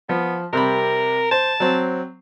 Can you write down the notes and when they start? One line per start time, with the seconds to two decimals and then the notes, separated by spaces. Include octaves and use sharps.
0.09 F3 B3
0.53 C3 G3 A#4 B5
1.31 C5 A5
1.60 F#3 C4